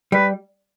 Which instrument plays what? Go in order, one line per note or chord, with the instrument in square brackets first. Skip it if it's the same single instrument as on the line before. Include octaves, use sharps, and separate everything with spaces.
[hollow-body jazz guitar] G3 [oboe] B4